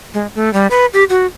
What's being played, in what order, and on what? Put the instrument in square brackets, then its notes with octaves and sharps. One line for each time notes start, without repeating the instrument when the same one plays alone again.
[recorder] G#3
A3
G3
B4
G4
F#4